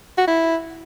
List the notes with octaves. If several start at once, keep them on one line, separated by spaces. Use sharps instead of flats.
F#4
E4